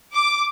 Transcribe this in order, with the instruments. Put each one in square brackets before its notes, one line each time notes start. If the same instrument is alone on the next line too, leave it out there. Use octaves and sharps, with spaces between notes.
[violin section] D6